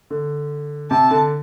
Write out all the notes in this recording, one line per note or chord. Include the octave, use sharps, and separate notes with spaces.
D3
C3 A5
D3